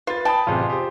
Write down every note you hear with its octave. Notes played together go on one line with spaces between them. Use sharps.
F4 B4 A6
G5 A5 B5 D#6
A1 C3 F4 G#4
G4 C5